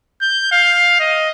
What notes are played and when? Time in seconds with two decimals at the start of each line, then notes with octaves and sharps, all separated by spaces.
0.22 G6
0.52 F5
1.00 D#5